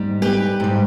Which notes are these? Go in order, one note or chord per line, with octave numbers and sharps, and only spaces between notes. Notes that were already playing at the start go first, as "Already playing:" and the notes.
Already playing: G#2 G3
G4 B4
G#2 G3